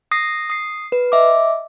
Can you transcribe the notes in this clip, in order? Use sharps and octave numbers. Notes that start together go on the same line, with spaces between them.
D#6 A#6 C7
D#6 C7
B4
D#5 E5 D6